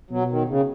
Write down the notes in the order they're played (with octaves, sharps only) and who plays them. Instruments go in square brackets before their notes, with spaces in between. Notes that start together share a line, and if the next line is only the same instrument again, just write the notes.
[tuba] B2 [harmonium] F#3
[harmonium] D#3
C#3